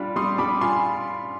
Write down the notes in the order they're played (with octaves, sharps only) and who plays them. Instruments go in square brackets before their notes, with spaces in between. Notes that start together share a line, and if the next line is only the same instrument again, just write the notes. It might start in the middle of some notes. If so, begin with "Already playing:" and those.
Already playing: [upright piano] G3 D4 F4 B5
G3 C6 D#6
G3 B5 D6
F4 G#5 C6